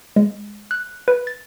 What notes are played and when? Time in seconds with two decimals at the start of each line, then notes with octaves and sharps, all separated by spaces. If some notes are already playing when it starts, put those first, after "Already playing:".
0.16 G#3
0.71 F#6
1.08 B4
1.27 A6